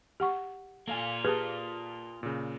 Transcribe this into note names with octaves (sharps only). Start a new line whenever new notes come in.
G4 F#5 C#6
A#3 F4 A4 F5 G#5
G4 G#4 B4 A5 D#6 F6
A#2 C#3